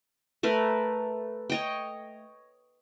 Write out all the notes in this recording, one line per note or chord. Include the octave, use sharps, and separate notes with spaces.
A3 A#4 B4
C#5 D#5 G5